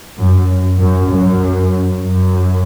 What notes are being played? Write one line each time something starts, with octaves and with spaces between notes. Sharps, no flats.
F#2
F#2
F#2
F#2